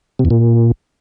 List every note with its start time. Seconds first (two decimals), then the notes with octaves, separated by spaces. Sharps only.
0.19 C3
0.25 E2
0.30 A#2